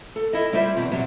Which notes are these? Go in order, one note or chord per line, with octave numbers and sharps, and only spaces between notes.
A4
E4 A4 D#5
G3 E4 F4 C5 E5
E2 B2 C4
C3 F#3 G3